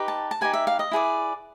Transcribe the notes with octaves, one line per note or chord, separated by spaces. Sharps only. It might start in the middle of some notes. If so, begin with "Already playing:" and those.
Already playing: D#4 G4 B4
A5
A5
D#4 G4 B4 G#5
E5
F5
D#5
E4 G#4 B4 D5